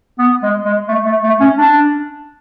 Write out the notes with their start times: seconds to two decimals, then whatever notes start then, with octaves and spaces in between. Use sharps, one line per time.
0.19 B3
0.43 G#3
0.65 G#3
0.88 A3
1.06 A3
1.24 A3
1.41 C#4
1.58 D4